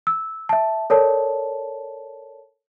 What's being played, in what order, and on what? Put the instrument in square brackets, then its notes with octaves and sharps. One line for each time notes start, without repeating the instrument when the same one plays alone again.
[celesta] E6
E5 A5
A4 A#4 C#5 D5 A5